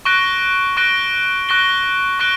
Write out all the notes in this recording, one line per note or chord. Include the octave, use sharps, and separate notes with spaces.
C#6 F#6 A#6 D7 G7
C#6 F#6 A#6 D7 G7
C#6 F#6 A#6 D7 G7
C#6 F#6 A#6 D7 G7